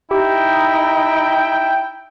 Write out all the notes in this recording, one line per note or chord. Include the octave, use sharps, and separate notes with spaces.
D#4 E4 G4 G5